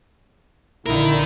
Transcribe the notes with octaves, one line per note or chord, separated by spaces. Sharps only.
A#1 D3 D#4 E4 A#4